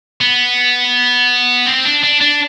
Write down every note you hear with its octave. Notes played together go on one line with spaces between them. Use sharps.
B3
C4
D4
D4
D4